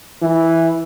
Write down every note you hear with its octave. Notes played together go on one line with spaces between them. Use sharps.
E3